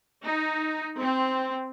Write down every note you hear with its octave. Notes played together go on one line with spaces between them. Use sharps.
D#4
C4